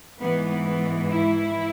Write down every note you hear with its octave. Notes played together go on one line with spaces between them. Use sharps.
G#2 E3 B3
B3
E4